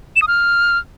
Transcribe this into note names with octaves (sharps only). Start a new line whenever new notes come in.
E7
D#6
F6